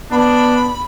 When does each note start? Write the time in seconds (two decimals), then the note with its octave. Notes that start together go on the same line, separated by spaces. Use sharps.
0.12 B3 D4 B5